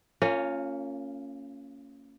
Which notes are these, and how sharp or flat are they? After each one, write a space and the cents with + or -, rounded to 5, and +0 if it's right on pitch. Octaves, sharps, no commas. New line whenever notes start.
A#3 -35 C#4 +0 F4 +5